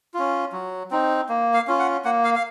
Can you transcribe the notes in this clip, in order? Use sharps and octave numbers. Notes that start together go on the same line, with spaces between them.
C#4 F4
F#3
C4 D#4
A#3
F5
C#4 F4
F#5
A#3 F#5
F5
F5